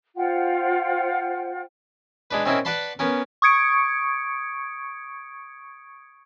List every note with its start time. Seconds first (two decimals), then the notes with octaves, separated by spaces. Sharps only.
0.16 F4 C5 F#5 G5
2.31 G#3 D4 B4
2.45 C4 C#4 D#4 E4 A#4
2.65 B4 D5 F#5 A5 B5 C6
2.99 B3 C#4 A#4
3.42 C#6 D#6 G#6 C#7 D7